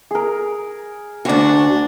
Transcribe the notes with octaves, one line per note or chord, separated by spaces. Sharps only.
G#4 A#4
D2 D4 F#4